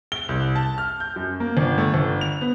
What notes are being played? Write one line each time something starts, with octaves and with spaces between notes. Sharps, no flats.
G7
C2
A5
F6
G6
F#2
A#3
G1
A3
G1
F7
B3